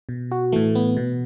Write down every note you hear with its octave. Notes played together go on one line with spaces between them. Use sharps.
B2
F#4
A2 E3 A3
B3
B2